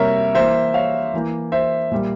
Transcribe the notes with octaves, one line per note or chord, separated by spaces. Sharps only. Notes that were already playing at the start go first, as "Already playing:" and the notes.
Already playing: C3 G3 A#3 A#4 C#5 E5
E3 A#3 C5 E5
C#5 F5
E3 A#3
C5 E5
A#2 G3 A#3